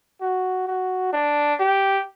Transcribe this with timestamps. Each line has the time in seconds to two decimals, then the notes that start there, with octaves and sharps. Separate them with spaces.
0.21 F#4
0.67 F#4
1.13 D4
1.60 G4